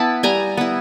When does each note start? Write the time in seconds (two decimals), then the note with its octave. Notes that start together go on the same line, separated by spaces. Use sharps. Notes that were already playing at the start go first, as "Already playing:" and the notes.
Already playing: B3 E4 A5 B5
0.23 G3 G#5 A#5
0.57 B3 E4